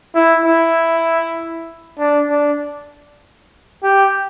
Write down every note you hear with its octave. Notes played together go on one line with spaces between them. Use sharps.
E4
E4
D4
D4
G4